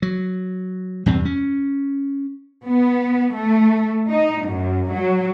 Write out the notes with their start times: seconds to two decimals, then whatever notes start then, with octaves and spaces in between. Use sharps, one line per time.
0.02 F#3
1.06 E2 G2 C3 C4
1.25 C#4
2.66 B3
3.33 A3
4.10 D#4
4.45 F#2
4.92 F#3